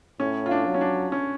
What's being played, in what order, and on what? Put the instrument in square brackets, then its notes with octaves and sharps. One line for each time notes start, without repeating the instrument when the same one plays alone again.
[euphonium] A2 [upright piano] C#4
[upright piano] F4
D4
[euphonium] F#3
[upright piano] C#4
D4
C#4